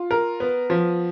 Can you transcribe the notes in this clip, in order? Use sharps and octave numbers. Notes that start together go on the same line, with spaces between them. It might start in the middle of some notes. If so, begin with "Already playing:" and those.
Already playing: F4
A#4
B3
F3